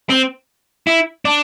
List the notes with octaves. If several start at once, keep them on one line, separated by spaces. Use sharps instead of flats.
C4
E4
D4